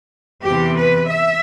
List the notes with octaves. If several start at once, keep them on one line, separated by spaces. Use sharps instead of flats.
E2 C3 E3 G4
B4
E5